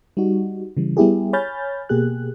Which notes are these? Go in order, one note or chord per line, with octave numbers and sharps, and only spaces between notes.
G3 D#4 F#4
C#3 E3 G3
G3 B3 E4 G4 G#4
C#5 G#5 B5 F6 G6 A6
B2 A#3 G4 G#4 F#6